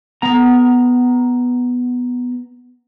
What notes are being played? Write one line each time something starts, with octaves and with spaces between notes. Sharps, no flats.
B3 A#5